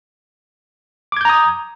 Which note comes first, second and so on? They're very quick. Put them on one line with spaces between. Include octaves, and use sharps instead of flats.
D6 G#6 G6 A#5 D#6